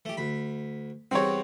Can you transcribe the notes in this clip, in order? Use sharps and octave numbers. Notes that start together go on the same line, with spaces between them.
A3 G4
D2 B5
E2 G3 C4 F#4 C#5